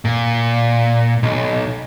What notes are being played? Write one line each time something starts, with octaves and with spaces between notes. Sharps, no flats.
A#2
B1